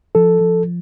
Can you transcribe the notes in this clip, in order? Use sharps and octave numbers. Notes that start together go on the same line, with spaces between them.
F3 A4
F3